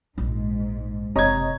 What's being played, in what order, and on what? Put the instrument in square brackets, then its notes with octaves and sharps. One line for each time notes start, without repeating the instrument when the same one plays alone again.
[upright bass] A#1 F4 [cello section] G#2
[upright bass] F#1 [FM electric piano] C3 C#5 D#5 [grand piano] A#5 G#6